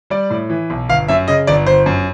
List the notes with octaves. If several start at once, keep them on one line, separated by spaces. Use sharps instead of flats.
G3 D5
A2
E3
B1
G1 F5
F#2 E5
C#3 D#5
G1 D5
G1 C5
F#2